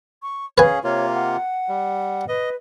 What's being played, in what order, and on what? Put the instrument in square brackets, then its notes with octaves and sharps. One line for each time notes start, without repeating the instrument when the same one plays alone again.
[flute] C#6
[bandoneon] C#4 G#4 [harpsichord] B4 G#5 [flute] F5
[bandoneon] C3 A#3 F4 [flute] C#5
[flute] F#5
[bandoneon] G3
[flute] B4 [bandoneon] D#5